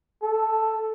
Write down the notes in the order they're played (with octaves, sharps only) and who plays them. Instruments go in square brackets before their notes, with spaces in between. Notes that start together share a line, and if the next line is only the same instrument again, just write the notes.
[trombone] A4